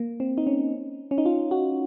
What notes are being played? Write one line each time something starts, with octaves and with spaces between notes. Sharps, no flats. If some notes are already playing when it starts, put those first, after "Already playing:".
Already playing: A#3
C4
D#4
C#4
C#4
D#4
F4
F#4